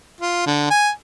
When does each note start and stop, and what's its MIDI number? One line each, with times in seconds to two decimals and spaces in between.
0.21 0.45 65
0.46 0.69 50
0.71 0.89 80